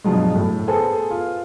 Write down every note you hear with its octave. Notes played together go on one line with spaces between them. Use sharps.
G2 B2 F3 F#3 G#3
A2
B3 G#4 A4 C5 G#5
F4